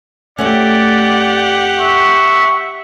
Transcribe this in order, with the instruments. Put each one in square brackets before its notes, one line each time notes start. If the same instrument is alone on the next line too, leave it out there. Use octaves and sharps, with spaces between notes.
[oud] F2 A3 C#4 [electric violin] G4 F#5 [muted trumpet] D5
[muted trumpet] E5 [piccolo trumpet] C#6